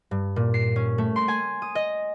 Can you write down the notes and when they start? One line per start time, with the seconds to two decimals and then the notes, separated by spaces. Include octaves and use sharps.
0.11 G2
0.36 A#2
0.54 C7
0.76 C#4
0.98 A3
1.16 C6
1.28 G#5
1.62 D#6
1.75 D#5